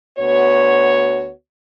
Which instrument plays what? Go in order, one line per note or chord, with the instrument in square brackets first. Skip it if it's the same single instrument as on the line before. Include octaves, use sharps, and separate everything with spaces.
[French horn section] D2 B3 F#4 C#5